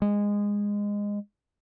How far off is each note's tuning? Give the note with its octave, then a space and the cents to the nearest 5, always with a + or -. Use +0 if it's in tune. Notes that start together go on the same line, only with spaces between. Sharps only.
G#3 -15